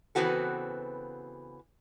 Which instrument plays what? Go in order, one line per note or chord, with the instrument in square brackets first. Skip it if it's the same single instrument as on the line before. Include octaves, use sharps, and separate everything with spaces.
[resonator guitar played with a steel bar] C#3 E3 B3 C4 F#4 A4